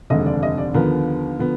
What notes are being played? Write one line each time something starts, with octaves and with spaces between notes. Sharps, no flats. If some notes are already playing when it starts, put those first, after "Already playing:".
F1 D#2 D3 G#3 D#5
D5
D#5
D5
D#2 D3 F3 B3 A#4
D3 F3 B3